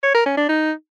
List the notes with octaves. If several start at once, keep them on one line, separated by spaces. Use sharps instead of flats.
C#5
A#4
C#4
D4
D#4